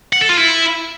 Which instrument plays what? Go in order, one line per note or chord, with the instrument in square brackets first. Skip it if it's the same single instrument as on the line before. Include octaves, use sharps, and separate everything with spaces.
[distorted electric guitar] F#5
A4
F4
E4